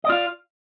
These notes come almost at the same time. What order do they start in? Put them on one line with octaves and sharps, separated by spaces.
D#5 D5 F4 F5